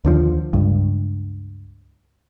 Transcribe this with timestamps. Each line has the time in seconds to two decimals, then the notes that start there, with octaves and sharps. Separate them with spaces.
0.05 D#2 D3 F3
0.53 C#2 G2